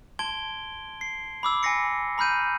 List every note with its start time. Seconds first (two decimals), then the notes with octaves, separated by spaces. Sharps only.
0.19 A5 C6 G#6 D7 G7
1.01 C7
1.43 B5 D6 E6
1.63 G#5 B5 D6 A#6 C7 C#7
2.18 A#5 B5 F6 G6 D#7